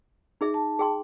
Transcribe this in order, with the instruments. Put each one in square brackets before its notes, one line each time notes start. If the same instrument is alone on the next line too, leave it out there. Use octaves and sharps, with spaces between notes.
[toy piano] D#4 G#4 E5
[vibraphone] A5
[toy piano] G#4 G5 C6